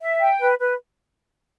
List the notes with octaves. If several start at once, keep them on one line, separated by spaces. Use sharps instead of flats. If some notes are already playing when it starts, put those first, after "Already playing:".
E5
G5
B4
B4